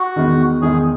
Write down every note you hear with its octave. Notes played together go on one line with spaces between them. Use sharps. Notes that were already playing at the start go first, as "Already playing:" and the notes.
Already playing: F#4
E2 D#3 G#3 B3 D#4
E2 D#3 G#3 B3 D#4 G#4